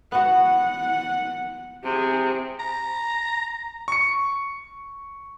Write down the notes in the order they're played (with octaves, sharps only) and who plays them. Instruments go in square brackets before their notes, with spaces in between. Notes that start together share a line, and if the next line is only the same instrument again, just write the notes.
[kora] B3 F#4 [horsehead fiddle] F#5
[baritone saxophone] C3 [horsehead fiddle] G#4
[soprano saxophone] A#5
[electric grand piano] C#6 C#7